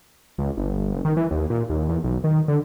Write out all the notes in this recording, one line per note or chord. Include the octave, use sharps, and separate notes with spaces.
C#2
G1
F#1
D#3
E3
D#2
A#2
D#2
E2
B1
D#3
D3